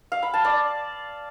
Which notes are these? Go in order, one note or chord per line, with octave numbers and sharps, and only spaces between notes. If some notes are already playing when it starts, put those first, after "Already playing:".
F5
B5
A5
D5